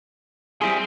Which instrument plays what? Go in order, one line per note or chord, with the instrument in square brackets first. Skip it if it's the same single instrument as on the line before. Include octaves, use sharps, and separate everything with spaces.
[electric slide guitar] G3 E4 G#4 [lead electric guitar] C4 C6